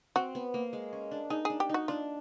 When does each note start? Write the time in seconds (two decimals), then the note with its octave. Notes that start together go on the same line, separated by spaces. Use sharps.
0.16 C4 F#4
0.35 B3
0.54 A#3
0.73 G#3
0.93 C#4
1.11 D4
1.30 D#4 G#4
1.45 D4 G#4
1.60 G4
1.69 D#4 F#4
1.88 D4 F4